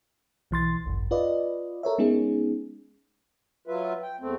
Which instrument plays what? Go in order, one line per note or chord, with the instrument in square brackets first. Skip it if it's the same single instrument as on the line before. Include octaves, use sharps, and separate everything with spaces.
[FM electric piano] B1 E3 C6 A6
G#1 C#2 F#2
F4 B4 D5 D#5
A4 A#4 C#5 E5
G#3 B3 C#4 D#4 G#4
[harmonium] F#3 F4 B4 E5
G5
E2 A3 C4